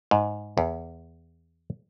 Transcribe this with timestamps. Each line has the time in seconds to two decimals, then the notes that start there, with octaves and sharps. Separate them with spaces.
0.11 G#2
0.58 E2